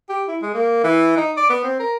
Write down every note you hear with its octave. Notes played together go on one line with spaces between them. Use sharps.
G4
E4
G#3
A#3
E3
D#4
D5
B3
C4
A#4